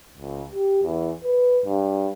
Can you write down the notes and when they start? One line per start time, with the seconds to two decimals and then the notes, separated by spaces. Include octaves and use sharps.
0.18 C#2
0.52 G4
0.83 E2
1.24 B4
1.65 G2